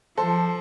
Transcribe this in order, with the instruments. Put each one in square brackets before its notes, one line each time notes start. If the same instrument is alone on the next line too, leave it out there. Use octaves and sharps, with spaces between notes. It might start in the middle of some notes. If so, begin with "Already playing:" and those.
[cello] F3 [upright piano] A4 C5